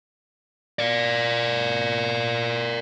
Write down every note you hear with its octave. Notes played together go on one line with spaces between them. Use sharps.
A#4 D5